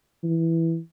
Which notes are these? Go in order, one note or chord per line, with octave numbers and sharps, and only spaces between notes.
E3